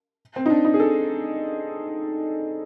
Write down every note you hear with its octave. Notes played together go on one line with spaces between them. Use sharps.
C4
D#4
D4
D#4
G#4
A4